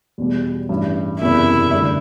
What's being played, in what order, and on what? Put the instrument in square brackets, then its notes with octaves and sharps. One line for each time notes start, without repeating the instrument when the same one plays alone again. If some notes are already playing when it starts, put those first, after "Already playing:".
[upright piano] E2 B2 G3
A1 G2 E3
[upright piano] F#1 E2 C3 [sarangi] E4
[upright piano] G2 D3 A3